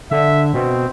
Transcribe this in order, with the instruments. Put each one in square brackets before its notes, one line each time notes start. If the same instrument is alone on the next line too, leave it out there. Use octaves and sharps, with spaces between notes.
[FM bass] D3 [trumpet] E5
[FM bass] B2 [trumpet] C4